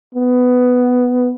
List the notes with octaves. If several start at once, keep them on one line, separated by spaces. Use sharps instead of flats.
B3